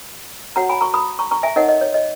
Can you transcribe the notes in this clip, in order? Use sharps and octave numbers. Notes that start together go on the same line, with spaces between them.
F#4 C#5 F#5 A#5
G#5 B5
A#5 C#6
B5 D#6
A#5 C#6
A#5 C#6
E5 G#5
D#4 A#4 C#5 D#5 F#5
D#5
C#5
D#5